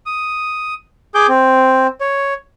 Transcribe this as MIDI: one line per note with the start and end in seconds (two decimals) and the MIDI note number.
0.06 0.74 87
1.15 1.27 68
1.15 1.27 86
1.15 1.27 91
1.28 1.87 60
2.01 2.34 73